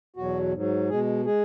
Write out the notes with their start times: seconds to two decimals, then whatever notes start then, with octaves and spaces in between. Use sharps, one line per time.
0.16 E2 B2 F#3 F#4
0.53 G#2 F#3
0.89 B2 G#3 G#4
1.26 G#3 G#4